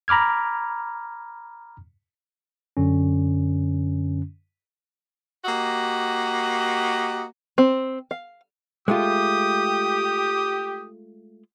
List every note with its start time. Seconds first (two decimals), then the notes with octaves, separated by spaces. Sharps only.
0.08 A#5 B5 D6 F6 G#6
2.77 F#2 D3 C#4
5.45 A#3 F#4 G4 D#5
7.58 C4
8.11 F5
8.88 G#3 A3 F4 G4 D#6